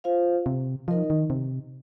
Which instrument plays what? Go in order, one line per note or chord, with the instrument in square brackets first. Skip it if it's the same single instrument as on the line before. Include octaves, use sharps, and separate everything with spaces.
[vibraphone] F4 C5 F5
[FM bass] C3
[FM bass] F3 [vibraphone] D#4 A#4 D#5
[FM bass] D#3
C3